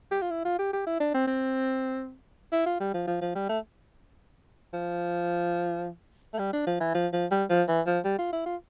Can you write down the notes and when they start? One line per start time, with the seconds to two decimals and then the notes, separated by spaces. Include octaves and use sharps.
0.12 G4
0.22 F4
0.31 E4
0.45 F4
0.59 G4
0.73 G4
0.87 E4
1.00 D4
1.14 C4
1.27 C4
2.52 E4
2.66 F4
2.80 G3
2.94 F3
3.07 F3
3.21 F3
3.35 G3
3.49 A3
4.73 F3
6.34 A3
6.39 G3
6.53 D4
6.67 F3
6.80 E3
6.94 F3
7.13 F3
7.31 G3
7.50 F3
7.68 E3
7.87 F3
8.05 G3
8.19 F4
8.32 E4
8.46 F4